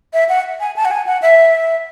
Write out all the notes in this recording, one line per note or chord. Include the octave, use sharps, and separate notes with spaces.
E5
F#5
G#5
A5
F#5
G#5
F#5
E5